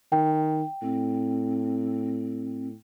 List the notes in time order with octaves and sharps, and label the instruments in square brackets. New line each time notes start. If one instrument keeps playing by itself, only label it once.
[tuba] D#3 [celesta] G5
[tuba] A2 [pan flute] C4